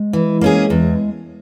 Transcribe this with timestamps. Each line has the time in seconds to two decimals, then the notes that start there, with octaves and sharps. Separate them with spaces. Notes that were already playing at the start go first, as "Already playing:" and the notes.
Already playing: G#3
0.13 E3
0.41 A#3 C#4 G#4
0.70 E2